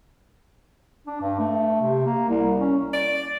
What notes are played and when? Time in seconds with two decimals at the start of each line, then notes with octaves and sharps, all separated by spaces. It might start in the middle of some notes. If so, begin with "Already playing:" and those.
1.07 D4
1.22 G2
1.39 A3
1.81 C3
2.06 A#3
2.29 C2
2.59 C#4
2.93 D5